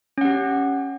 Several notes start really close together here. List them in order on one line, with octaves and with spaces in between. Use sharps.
C#4 F#5 G4